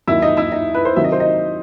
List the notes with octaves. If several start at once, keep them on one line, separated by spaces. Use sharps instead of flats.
D#2 D#3 F#3 E4 E5
D#4 D#5
E4 E5
D#4 D#5
B4
C5
C3 D#3 F#3 E5
D#5
C5
D#4 D#5